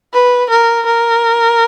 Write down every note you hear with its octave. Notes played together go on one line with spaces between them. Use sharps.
B4
A#4
A#4